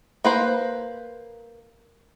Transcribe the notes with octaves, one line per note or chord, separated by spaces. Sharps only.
A#3 B4 C5